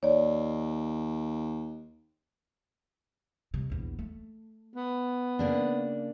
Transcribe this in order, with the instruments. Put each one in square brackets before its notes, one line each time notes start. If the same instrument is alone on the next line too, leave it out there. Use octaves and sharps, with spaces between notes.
[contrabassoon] D#2 [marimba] C#5 D5
[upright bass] C3 G3
A#1 E2
A3
[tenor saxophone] B3
[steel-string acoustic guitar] C#3 A#3 D4